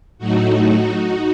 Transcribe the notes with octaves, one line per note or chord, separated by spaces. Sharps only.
A2 F#3 A3 D#4 F#4